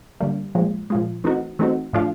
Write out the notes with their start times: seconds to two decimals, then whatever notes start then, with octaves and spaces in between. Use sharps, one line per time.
0.21 D3 G3 A#3
0.55 A#2 F3 G#3
0.90 A#2 F3 G#3
1.24 E3 A3 C4 D#4 F#4
1.59 E3 A3 C4 D#4 F#4
1.93 A2 F3 A3 D4 F4